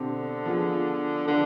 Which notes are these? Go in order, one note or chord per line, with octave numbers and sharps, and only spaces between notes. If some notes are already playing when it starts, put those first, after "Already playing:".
Already playing: B2 D3 C4 G4
F3 B3 F4 G#4
D3 F3 B3 F4 G#4